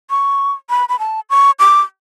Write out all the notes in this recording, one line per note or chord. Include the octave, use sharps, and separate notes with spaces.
C#6
B5
B5
A5
C#6
D6